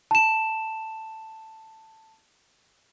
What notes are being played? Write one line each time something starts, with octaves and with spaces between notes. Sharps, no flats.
A5 E7